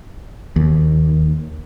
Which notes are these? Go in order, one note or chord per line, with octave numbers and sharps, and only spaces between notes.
D#2